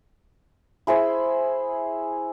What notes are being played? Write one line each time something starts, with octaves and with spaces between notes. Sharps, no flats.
E4 G#4 C5 E5